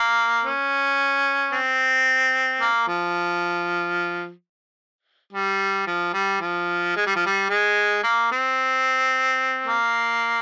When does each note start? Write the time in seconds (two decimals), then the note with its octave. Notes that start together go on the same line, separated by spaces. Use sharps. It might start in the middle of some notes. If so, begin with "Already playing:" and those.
Already playing: A#3
0.44 C#4
1.53 C4
2.61 A#3
2.88 F3
5.33 G3
5.87 F3
6.14 G3
6.41 F3
6.96 G#3
7.07 G3
7.16 F3
7.26 G3
7.50 G#3
8.04 A#3
8.32 C4
9.67 A#3